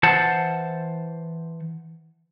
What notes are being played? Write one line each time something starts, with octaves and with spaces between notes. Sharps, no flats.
E3 C5 F#5 A5